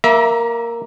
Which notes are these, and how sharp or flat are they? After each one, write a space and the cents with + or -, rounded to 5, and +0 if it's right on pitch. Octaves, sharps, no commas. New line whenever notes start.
A#3 +0 E5 +0 A#5 +45